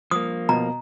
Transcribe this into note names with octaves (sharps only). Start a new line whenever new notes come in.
F3 A#3 D#6
B2 A#5